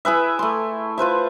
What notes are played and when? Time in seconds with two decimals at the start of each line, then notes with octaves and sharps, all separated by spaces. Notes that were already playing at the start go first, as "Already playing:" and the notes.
0.05 E4 G#4 B4 E5
0.39 A3 C6
0.98 F4 B4 C5 E5